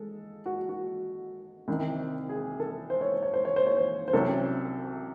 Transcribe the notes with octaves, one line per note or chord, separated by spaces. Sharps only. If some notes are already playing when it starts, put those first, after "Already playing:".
Already playing: G#3 A4
F#4
F#4
C2 C3 D#3
G#4
A4
C5
C#5
C5
C#5
C5
C#5
C5
C#5
C5
C5
C2 C3 F#3 C#4 A4